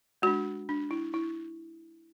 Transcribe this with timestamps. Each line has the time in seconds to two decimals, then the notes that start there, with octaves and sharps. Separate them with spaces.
0.22 G#3 D4 F#4
0.69 D4
0.91 E4
1.14 E4